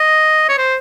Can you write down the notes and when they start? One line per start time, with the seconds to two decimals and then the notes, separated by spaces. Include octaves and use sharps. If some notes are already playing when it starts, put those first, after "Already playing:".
Already playing: D#5
0.49 C#5
0.58 C5